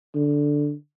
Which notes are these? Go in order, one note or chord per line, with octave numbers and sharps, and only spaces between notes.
D3